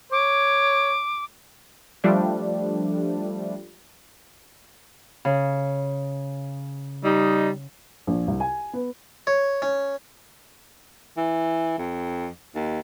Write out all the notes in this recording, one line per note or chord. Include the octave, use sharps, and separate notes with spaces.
C#5 D6
F3 G3 A3 D4
C#3
G3 D#4
A#1
C2
G#5
B3
C#5
C#4
E3
F2
D#2